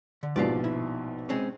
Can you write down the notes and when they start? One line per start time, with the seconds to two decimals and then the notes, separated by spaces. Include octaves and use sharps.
0.23 D3
0.36 A#1 G#2 B2 F4 G4 D5
0.64 E4
1.29 G#3 C4 C#4